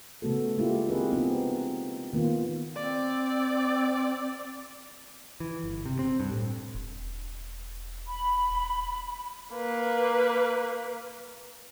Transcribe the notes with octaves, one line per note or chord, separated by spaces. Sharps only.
C#3 A3 B3 F#4 A4
G#3 A#3 D4 E4 F4 G4
C4 F4 G4 G#4 A#4 B4
B3 C4 D#4
D#3 A#3 B3 F4
C4 D5
E3
G1
C3
C4
G2
A2
E1
B5
A#3 B4